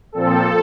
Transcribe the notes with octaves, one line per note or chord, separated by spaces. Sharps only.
A#2 F3 C4 A4